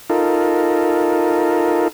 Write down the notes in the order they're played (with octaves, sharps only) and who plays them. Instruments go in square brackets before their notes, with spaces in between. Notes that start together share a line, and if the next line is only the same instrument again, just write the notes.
[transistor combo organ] D#4 F4 A4 A#4